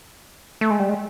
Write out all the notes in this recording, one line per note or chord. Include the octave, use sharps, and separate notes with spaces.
A3
G#3
G3
G#3